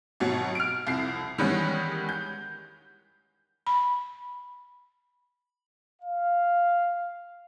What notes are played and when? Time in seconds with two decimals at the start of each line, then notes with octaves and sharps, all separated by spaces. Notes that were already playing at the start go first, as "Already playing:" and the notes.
0.20 G#1 B2 F#3
0.55 F6 D7
0.87 C2 F2 C7
1.38 D#3 E3 G3 G#3 B3 C#4
2.09 G6
3.67 B5
6.02 F5